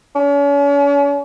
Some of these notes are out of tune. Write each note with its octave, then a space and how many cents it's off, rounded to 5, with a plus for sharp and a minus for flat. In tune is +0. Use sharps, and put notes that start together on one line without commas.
C#4 +40